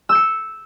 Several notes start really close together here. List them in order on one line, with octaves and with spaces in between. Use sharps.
E6 G6 C#7